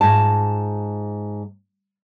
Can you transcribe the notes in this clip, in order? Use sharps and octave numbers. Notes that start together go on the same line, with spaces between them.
G#2 F4 A5